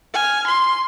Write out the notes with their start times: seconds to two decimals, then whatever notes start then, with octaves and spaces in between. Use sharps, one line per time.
0.14 G#5 F6
0.47 C6